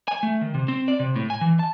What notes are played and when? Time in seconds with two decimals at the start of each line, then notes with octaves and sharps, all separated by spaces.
0.08 G#5
0.23 A3
0.41 D#3
0.54 C3
0.68 C4
0.88 D5
1.00 C3
1.16 A2
1.30 G#5
1.41 E3
1.59 A5